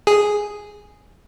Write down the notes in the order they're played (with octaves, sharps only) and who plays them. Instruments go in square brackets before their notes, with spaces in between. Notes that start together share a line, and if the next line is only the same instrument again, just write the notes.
[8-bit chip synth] G#4